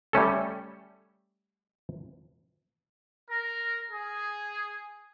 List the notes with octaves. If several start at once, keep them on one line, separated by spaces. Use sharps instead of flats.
G3 A3 C#4 A4
A#4
G#4